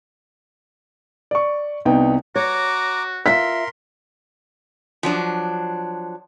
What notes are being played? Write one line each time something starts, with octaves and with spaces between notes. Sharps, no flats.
D5 C#6
C2 B3 D#4 G5
F#4 C#5 A#5 D6
F4 A#4 E5 C6 B6
F3 F#3 D4